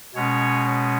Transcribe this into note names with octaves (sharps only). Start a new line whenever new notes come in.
B2 G#3 C#4 C#5